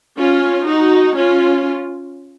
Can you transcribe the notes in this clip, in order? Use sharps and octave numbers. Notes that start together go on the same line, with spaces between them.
C#4 F4
D#4 F#4
C#4 F4